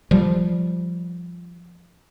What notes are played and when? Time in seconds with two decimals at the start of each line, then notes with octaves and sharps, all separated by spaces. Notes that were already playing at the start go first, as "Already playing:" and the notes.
0.11 F3 G3